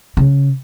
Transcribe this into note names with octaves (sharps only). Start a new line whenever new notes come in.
C#3